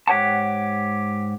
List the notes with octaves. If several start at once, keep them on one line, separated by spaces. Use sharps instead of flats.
G#2 G4 C#5 F#5 A5